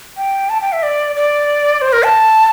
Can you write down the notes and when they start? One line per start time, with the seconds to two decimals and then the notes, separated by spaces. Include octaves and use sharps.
0.17 G5
0.50 A5
0.61 G5
0.72 E5
0.83 D5
1.16 D5
1.82 C5
1.93 A#4
2.03 A5